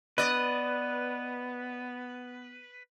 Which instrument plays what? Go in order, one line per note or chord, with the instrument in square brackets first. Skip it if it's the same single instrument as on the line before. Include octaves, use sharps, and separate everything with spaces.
[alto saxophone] B3 [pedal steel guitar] B4 [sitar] D5 D#5